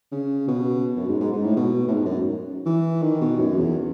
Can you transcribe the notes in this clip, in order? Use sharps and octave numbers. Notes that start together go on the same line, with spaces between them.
C#3
B2
F#2
G#2
G#2
G#2
A2
B2
A2
G#2
F#2
E3
D#3
B2
F#2
E2